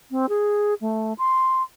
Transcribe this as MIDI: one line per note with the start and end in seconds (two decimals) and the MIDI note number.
0.11 0.26 60
0.29 0.74 68
0.81 1.13 57
1.18 1.62 84